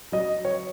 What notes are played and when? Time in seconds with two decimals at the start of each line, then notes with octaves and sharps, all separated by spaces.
0.12 F#3 D#5
0.45 C#5